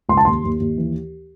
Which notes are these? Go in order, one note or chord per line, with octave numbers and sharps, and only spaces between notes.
C#2 C6
A5
D#2 C6
D#2
D#2
E3